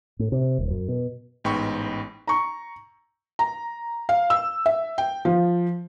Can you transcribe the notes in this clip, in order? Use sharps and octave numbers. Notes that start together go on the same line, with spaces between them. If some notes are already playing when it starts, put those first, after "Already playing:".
A2
C3
D#1
F#2
B2
A1 G#2 B3 G5 B5 C#6
A#5 C#6
A#5
F5
E6
E5
G5
F3